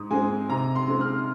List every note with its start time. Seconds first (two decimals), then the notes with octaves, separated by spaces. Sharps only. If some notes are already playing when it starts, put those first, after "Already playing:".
Already playing: G#2 D#6
0.11 G#3 C4 G#5
0.49 C3 A#5
0.75 C6
0.88 G#3 C4
1.01 F6